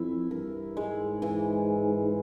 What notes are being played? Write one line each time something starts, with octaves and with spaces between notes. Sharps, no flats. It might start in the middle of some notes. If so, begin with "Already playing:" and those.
Already playing: F2 E3 E4
G2 A#4
G#2 G#3
E3